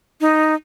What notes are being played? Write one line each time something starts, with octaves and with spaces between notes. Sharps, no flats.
D#4